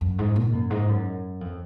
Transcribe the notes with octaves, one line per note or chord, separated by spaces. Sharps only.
F#2
G#2
A#2
F#2
G#2
F#2
F2